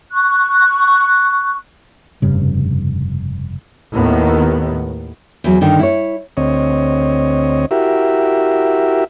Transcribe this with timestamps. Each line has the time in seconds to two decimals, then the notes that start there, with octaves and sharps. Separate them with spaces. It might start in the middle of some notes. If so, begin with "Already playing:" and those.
0.11 C#6 F#6
2.22 F1 G2 C#3
3.93 D#2 A2 D#3 B3
5.44 E2 F#3
5.61 G2 D3 D#3
5.79 E4 C#5
6.37 D2 C4 C#5 D#5
7.71 E4 F#4 G4 A#4 E5